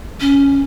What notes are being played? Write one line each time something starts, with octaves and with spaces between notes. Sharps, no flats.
C#4